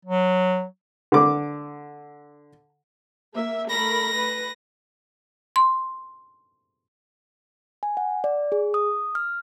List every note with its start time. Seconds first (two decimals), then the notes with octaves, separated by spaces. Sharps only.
0.05 F#3
1.12 D3 D6
3.34 A#3 E5
3.70 A3 A#4 B5 A#6
4.15 B4
5.56 C6
7.83 G#5
7.97 F#5
8.24 D5
8.52 G#4
8.74 D#6
9.15 F6